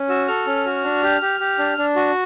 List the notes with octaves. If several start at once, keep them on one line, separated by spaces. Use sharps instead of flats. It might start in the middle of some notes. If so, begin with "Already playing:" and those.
Already playing: C#4
F#4 E6
A4 F6
C#4
F#4
D4
G4
G4
G4
D4
D4
F#4